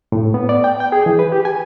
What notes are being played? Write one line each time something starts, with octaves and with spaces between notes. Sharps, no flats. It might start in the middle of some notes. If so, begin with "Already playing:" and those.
A2
B3
D5
G5
G5
G#4
E3
B4
G4
G#5